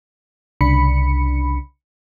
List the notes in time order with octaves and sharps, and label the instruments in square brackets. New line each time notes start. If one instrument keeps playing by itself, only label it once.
[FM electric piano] C2 C#3 D4 B5 C#7